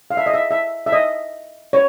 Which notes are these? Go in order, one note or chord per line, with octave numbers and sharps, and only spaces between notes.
F5
E5
D#5
E5
E5
E5
D#5
C#5